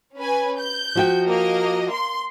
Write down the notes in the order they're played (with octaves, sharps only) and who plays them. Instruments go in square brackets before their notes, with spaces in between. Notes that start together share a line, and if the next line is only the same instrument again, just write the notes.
[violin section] C#4 B4 G#5
G6
[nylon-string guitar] F3 F#4 G5
[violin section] A#3 D#5
C6